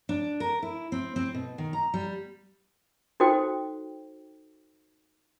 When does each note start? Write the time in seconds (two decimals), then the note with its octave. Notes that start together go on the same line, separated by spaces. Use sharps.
0.09 D4
0.40 A#4
0.63 E4
0.92 C4
1.16 C4
1.34 B2
1.58 D#3
1.73 A#5
1.94 G3
3.20 D#4 F#4 A4 C5 G5